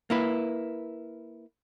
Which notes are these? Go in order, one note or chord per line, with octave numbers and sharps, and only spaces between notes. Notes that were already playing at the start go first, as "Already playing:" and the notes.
A#3 E4 B4